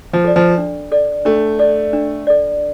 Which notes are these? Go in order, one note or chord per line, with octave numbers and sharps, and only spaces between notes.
F3
A4 D5
F3
D4
A4 D5
A3 D4
A4 D5
D4
A4 D5